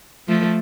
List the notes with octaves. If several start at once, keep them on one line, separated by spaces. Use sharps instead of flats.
F3 A3